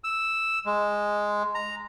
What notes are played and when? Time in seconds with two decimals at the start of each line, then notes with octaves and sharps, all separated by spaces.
0.04 E6
0.66 G#3
1.55 A#5